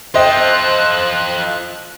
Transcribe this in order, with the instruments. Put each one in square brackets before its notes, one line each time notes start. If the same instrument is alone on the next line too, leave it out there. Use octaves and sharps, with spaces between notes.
[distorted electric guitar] F4 A4 [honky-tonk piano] C5 D#5 G5 [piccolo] F#6